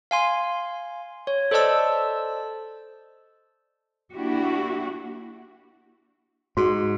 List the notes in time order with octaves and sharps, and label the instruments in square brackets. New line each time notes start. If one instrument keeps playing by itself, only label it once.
[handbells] F5 G#5 C6
C#5
A4 C5 D5 D#5 A5 E6
[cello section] A#3 D4 E4 F#4 G4
[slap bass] G#2 [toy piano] F#4 G#4